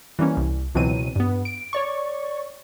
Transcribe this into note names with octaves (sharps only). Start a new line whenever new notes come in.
E3 G3 A#3 C#4
C2
C#2 B2 E3 F#3 C4 D#7
G2 B3
D7
C#5 D5 C#6